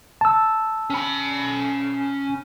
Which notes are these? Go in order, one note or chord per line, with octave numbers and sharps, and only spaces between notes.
A5 E6
C#4 B5